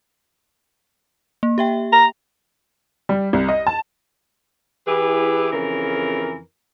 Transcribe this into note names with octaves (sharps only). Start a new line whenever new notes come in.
A#3
G4 E5 G5
A#5
G3
C2
D#5
A5
E3 E4 G4 G#4 B4
F2 C#3 E3 A#4